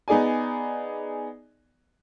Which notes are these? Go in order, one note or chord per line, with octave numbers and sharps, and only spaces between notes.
B3 D#4 G#4 D5 G#5